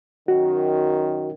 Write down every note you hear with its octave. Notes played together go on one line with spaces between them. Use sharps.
F#2 D#3 F#4